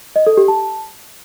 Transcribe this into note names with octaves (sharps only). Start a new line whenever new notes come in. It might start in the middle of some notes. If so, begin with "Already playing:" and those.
D#5
A4
G4
A5